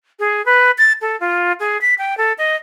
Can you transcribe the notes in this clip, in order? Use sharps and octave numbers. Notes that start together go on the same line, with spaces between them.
G#4
B4
A6
A4
F4
G#4
B6
G5
A4
D#5